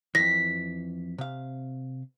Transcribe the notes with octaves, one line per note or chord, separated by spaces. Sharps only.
F2 E3 A#6 B6
C3 F5